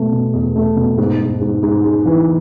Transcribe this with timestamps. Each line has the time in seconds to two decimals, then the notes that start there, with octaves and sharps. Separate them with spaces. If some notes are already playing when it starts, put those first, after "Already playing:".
Already playing: B2 A3
0.12 B2
0.33 E2
0.56 A3
0.76 B2
0.98 G#2
1.19 G#2
1.41 G#2
1.63 G#2
1.84 G#3
2.06 E3